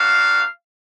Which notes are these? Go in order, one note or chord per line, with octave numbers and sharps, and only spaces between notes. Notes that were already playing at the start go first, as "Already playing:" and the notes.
Already playing: A#3 D4 F#4 F5